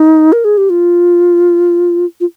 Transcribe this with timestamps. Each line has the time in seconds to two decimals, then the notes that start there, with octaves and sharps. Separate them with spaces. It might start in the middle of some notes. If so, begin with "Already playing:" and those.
Already playing: D#4
0.33 A#4
0.45 G#4
0.57 G4
0.70 F4
2.20 F4